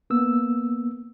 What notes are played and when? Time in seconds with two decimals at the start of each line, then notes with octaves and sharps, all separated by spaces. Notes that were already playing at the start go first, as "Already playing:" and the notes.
0.10 A#3 B3 E6